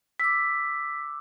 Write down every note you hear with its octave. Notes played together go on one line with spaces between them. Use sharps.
D6 E6 B6